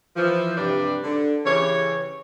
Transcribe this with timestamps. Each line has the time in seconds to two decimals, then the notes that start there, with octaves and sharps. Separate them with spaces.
0.16 E3 F3
0.57 G2 C3 D4 B4 D5
1.04 D3
1.45 C#3 E3 G4 C#5